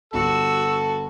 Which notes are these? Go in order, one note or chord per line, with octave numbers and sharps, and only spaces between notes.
G1 G2 F#4 A4 E6